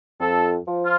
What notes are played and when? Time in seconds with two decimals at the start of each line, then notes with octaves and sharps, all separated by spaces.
0.20 F2 A4
0.68 F3
0.83 F4